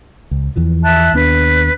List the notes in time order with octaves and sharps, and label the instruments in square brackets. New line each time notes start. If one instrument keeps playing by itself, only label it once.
[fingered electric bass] C#2
E2 E3 F3
[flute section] E5 A5 F#6
[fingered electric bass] D#2 B3 D4 [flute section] B4